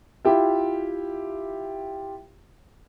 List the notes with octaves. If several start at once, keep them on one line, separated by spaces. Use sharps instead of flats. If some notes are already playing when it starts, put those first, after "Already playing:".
E4 F4 G4 E5